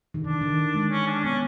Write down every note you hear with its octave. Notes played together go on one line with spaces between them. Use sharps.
D#3
D3 D4
D#3
D#3
G#3
C#4
D4
B3 C#4